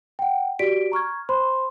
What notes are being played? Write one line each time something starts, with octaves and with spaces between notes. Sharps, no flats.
F#5 G5
F#4 G4 D5 B6 D7
A#5 C#6 F6 G#6
C5 B5 C6